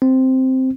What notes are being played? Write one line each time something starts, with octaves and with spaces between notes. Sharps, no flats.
C4